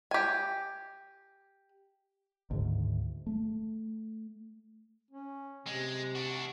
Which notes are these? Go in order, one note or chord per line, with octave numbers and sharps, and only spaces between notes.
G4 G#5
D2 G#2 D#3
A3
C#4
C3 G#3
D4 F#4